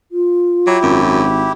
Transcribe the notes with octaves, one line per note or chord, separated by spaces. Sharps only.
F4
F#3 E4 G4
G#1 F#2